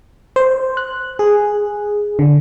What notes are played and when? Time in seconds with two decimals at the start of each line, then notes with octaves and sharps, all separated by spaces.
0.36 C5
0.77 F#6
1.19 G#4
2.19 D3